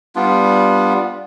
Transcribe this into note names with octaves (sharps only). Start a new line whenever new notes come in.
G3 B3 D4 F4